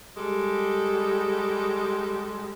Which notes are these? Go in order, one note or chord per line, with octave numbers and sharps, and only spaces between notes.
G3 G#3 G4 A4